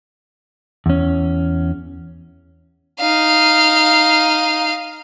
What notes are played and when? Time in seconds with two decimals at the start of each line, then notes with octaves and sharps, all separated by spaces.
0.86 E2 C#4
3.01 D#4 F5